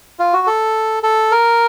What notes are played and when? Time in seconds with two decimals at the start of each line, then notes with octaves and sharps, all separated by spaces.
0.19 F4
0.33 F#4
0.47 A4
1.03 A4
1.31 A#4